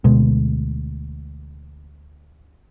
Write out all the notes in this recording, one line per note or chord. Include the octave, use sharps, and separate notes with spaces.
D2 B2 G#3